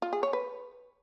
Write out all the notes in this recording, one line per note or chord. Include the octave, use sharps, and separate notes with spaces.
F4
G#4
C#5
B4